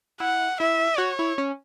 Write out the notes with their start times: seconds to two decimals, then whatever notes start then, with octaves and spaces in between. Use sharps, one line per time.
0.20 E4 F#5
0.60 E4 E5
0.98 F#4 C#5
1.19 E4
1.38 C#4